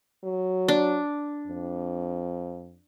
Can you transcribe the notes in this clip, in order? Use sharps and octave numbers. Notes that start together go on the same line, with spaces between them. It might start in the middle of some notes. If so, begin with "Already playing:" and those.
F#3
D4
F2